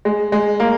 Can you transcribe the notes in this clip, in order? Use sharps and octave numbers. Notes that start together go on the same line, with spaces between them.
G#3
G#3
A#3